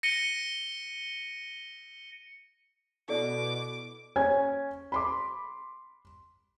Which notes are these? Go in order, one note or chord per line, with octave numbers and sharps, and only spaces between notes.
A#6 C#7 D#7 G7
B2 E4 A4 D5 D6
C#4 G#5 G#6
B5 C6 D6